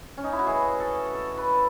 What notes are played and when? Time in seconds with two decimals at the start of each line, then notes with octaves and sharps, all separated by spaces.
0.18 C#4
0.24 D#4
0.32 E4
0.39 F#4
0.46 E3 A3 C#4 G#4
0.80 A4
1.14 A4
1.37 B4